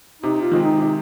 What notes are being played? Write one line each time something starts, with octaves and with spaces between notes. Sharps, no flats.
C3 D#4
F4
D#3 G#3 C4
D#4
C3 D#4